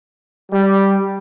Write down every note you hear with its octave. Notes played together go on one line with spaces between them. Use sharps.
G3